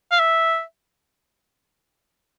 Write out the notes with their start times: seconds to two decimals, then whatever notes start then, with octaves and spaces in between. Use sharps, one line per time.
0.12 F5
0.20 E5